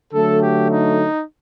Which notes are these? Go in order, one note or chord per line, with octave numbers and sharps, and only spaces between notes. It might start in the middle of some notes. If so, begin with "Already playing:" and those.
D3 F#3 A3 A4
G4
D#4